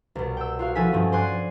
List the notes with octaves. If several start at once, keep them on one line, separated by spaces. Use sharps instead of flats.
C2 B2
G5 E6
F4 F#4 F5
F3 E4 F#4 A4 G#5 B6
G2 F3 C4 C#4
C5 D5 G#5 C6 F#6